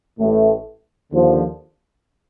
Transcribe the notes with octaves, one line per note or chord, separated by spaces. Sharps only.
A1 A2 A3
D#2 D3 F3